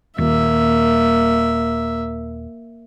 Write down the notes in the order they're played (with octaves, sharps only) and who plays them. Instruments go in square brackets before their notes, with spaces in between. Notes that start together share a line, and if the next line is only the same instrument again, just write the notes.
[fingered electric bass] D#1 [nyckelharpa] A#3 E5